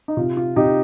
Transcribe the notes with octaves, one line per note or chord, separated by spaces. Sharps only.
D#4
C3 F4
F4
C3 D#4 G4